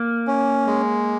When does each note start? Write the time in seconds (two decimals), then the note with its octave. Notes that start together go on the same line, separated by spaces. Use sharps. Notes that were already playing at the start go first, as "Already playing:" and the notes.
Already playing: A#3
0.27 C#4
0.67 G#3